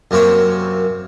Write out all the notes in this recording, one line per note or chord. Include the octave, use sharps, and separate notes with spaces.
F#2 C3 A#3 C4 C#5 E5